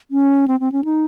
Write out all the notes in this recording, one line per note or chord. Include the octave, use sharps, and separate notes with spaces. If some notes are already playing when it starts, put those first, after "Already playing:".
C#4
C4
C4
C#4
D#4